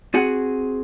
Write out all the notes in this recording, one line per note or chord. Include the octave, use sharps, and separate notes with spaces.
C4 F#4 G#4 F#5